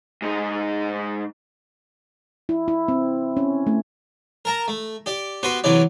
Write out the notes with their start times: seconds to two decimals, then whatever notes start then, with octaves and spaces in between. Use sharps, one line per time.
0.22 G#2 D#4
2.49 E4
2.68 E4
2.88 C4
3.37 C#4
3.67 A3
4.45 A#4 A5 A#5
4.68 A3
5.06 G4 D5
5.43 B3 F#4 G4 B4 C5
5.64 C3 E3 F#3 B4 D5